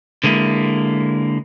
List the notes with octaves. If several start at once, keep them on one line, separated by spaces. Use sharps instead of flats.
D3 G#3 A#3 E4